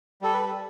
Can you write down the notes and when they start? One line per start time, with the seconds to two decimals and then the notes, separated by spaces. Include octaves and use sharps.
0.22 G3 A4
0.34 B4